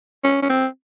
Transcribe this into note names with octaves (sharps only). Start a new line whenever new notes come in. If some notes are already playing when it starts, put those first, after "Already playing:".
C#4
C#4
C4